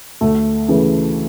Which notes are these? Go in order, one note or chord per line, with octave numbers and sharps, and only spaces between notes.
D2 A3
C#3 E3 A3